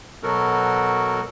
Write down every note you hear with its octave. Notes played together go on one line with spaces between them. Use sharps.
B2 F#3 B3 F#4 A4 A#4